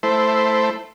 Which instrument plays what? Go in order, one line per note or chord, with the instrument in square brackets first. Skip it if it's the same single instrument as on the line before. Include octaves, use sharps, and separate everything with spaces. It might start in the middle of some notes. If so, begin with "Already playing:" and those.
[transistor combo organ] A3 E4 C5